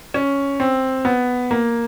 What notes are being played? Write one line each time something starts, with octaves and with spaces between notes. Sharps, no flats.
C#4
C4
B3
A#3